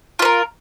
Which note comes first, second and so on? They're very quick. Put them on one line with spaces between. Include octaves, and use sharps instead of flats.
F4 B4 A#4